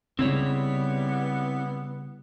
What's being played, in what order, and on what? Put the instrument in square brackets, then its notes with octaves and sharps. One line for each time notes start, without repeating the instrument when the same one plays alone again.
[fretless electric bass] C#3 [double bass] G3 [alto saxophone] B3 [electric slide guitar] C4 E4 C#5